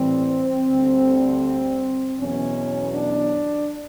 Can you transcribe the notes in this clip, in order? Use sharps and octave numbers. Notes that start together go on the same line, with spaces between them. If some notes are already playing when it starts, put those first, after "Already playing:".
Already playing: A2 E3 G3 C4
D2 D3 G3
E2 B2 F#3 C#4
D4